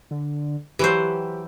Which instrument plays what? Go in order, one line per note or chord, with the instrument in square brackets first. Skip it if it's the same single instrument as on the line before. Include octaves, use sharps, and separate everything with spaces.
[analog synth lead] D3
[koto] E3 F#3 C5 [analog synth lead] G4